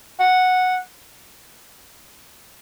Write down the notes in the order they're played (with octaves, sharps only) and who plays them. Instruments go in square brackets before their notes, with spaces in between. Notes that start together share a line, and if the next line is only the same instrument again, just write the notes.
[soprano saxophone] F#5